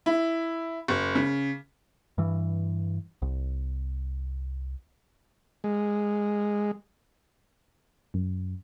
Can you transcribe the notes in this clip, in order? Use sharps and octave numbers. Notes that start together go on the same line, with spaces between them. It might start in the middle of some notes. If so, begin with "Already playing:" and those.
E4
F#1
C#3
G2 E3
C2
G#3
F#2